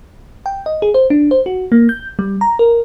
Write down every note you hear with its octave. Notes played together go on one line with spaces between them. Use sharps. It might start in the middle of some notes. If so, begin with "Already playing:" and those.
G5
D#5
G#4
C5
D4
C5
F#4
A#3
G6
G3
A#5
A#4